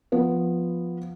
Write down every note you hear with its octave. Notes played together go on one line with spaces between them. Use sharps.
F3 B3